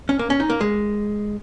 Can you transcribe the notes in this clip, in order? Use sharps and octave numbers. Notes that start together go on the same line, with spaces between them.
C#4
A#3
C#4
D#4
A#3
G#3